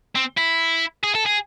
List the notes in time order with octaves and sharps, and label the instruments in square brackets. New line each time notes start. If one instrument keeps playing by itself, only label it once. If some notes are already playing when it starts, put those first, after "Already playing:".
[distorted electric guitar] C4
E4
G#4
A4
G#4